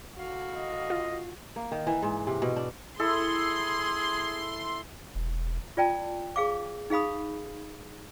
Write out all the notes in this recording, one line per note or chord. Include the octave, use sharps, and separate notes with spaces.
C2 D3 F#4 F5
D#5
F4
A#3
D#3
E3
G#2
C3
B2
D4
E4 G#4 A4 C6
E1
F4 D5 G5 A5
G#4 F5 D6
D#4 G#4 F5 B5 D#6